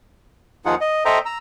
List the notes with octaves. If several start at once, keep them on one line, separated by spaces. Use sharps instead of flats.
D#2 F3 D#4 F4 G#4 F#5
D#5
A4 C5 D#5 E5 G5 A#5
A#5 E6